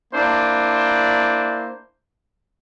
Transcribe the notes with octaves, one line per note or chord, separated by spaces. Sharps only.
A#3 D4 E4 C5